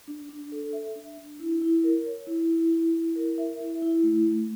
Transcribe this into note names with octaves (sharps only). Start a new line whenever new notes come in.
D4
D4
A4
E5
D4
D4
E4
E4
A#4
C#5
E4
E4
E4
E4
A#4
E5
E4
E4
A3
A3